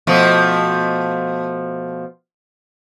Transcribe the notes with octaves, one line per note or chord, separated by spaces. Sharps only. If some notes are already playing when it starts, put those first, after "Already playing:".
B2 F3 A3